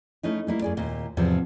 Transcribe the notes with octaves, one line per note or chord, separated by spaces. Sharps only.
A3 C#4 D#4 E4
G3 A#3 E4
F#2 G#4 D5
D#2 A#2
E2 G#2 C3 F3